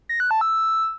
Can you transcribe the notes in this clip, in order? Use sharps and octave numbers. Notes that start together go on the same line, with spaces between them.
A#6
F#6
A5
E6